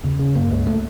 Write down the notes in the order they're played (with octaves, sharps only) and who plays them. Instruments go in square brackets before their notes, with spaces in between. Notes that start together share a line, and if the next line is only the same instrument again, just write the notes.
[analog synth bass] E2 [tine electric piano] C#3
[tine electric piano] C#3
[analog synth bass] G2 [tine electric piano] A#3
[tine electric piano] C#2
[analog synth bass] A2 [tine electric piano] A3